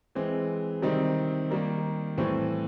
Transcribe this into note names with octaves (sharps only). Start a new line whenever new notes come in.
E3 G#3 C4
C3 D#3 G3 C4 D#4
D#3 G3 A#3
A2 E3 G3 C4